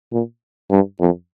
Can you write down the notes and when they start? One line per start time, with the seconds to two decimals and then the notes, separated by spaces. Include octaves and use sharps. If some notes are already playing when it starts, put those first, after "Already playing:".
0.12 A#2
0.70 G2
1.00 F2